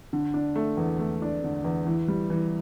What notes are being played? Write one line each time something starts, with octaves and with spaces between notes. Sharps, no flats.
D3
D4
A3
E2
A3
D4
D3
E2
E3
G3
E3